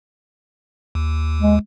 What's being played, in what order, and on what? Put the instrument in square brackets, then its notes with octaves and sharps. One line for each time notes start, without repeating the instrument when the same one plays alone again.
[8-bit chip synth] D#2
[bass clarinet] G#3